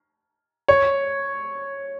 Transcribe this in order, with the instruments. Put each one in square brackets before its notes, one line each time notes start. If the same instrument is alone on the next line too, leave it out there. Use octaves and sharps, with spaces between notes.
[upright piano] C#5